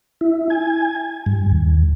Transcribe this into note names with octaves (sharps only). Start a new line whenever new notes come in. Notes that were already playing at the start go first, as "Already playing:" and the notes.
E4
G#5
G2
D#2